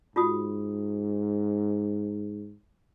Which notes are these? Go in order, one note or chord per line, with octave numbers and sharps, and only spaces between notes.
G#2 F4 F#4 D#6